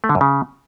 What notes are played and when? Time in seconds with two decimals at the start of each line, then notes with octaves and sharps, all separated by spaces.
0.04 A3
0.09 D3
0.15 F#2
0.21 C#3